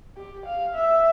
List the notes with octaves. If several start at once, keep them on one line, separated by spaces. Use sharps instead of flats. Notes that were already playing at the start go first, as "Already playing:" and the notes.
G4
F5
E5